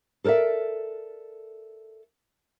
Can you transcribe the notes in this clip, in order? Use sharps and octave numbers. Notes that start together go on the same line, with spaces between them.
A4 A#4 C5 D5 E5